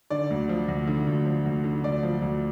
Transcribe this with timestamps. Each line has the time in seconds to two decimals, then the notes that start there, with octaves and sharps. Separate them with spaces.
0.10 D3 D5
0.30 D2
0.49 F3
0.68 D2
0.87 D3
1.07 D2
1.26 F3
1.45 D2
1.64 D3
1.84 D2 D5
2.03 F3
2.22 D2